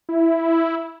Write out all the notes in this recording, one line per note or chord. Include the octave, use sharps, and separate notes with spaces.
E4